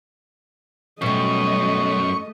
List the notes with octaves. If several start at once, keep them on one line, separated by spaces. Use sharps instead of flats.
F#2 B2 G3 A3 D#5 C#6